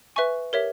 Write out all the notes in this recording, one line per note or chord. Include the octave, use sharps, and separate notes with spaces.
B4 E5 G#5 C#6
G4 A#4 C#5 E5